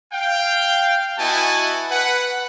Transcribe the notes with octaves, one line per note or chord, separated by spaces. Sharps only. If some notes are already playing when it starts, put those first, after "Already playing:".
F5 G5
B3 E4 F#4 D#5 G#5 A5
B4 F#5